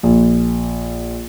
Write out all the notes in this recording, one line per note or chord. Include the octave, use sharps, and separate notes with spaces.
A#1